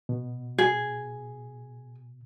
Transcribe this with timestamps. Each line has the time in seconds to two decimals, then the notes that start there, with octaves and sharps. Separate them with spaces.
0.09 B2
0.58 G#4